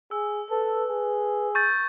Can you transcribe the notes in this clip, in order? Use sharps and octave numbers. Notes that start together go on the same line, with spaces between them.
G#4 E6
A4 B4
G#4
C#6 G6 A6